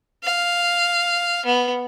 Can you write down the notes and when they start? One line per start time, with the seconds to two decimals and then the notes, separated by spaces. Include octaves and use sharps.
0.24 F5
1.45 B3